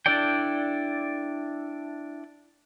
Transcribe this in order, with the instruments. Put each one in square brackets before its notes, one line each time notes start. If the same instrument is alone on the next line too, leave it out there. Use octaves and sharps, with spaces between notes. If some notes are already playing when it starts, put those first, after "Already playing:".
[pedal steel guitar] D4 E4 A4 D5 G5